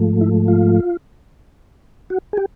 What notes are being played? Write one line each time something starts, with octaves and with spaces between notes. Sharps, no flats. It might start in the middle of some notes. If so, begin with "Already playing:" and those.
Already playing: G#2 F3 A3
E4
F4
F#4
G#4
G4